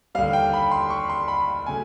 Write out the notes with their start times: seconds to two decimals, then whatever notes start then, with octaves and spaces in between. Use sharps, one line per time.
0.15 D#2 D3 G3 F5
0.33 G5
0.53 B5
0.71 C6
0.90 C#6
1.10 C6
1.28 B5
1.66 C#3 F#3 A3 G#5